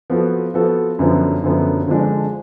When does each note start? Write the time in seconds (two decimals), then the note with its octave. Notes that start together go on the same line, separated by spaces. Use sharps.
0.10 F3 B3 F#4 A4
0.54 F3 B3 F#4 A4
0.99 F#2 D3 F3 B3
1.43 F#2 D3 F3 B3
1.88 D3 F3 G#3 D4